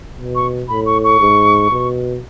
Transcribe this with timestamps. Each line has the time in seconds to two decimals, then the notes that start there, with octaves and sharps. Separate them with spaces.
0.18 B2
0.35 C#6
0.69 A2 B5
0.86 C#6
1.04 C#6
1.20 G#2
1.71 B2